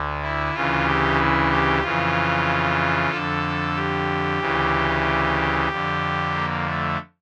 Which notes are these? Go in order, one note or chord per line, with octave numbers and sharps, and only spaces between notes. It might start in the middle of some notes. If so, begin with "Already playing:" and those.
Already playing: D2 D3
E4
D2 C#3 E3 F4
G4
E4
G4
F2 C#3 E3 F4
F2 D3 A4
G4
D2 C#3 E3
F2 D3
A#3
A3